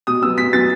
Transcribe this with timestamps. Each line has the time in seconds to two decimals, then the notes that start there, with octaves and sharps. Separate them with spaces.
0.07 B2 D#6
0.22 F#3 B3 E6
0.38 B2 B6
0.52 F#3 B3 A6